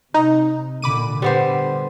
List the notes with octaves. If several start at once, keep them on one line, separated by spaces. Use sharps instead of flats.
C3 D#4
A#2 D3 B5 D6 D#7
D3 G3 B3 C5